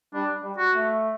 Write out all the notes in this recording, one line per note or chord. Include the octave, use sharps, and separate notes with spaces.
G3 D4
G3
F#4
A3